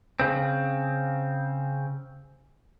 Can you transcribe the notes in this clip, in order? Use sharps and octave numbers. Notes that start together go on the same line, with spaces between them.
C#3 C4